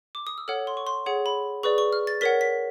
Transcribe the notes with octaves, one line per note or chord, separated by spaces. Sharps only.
D6
D#6
E6
A4 C#5 F#5 F6
C6
C#6
C6
G#4 C#5 F#5
B5
G#4 B4 D5 C#6
C#6
F6
A6
A#4 C#5 F#5 B6
B6